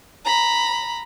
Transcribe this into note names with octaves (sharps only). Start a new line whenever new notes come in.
A#5 B5